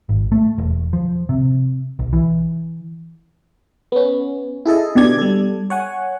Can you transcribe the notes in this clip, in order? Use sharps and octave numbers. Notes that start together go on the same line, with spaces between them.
G#1
A3
E1
F3
C3
B1
E3
B3 C#4
E4 G#4 A4 D#5
B2 D3 G4 D5 G#6
G3 A4
C#5 F#5 G#5